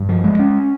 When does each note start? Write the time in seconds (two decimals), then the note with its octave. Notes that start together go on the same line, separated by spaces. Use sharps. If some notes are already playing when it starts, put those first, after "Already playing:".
Already playing: G2
0.09 F3
0.24 G#3
0.39 C#4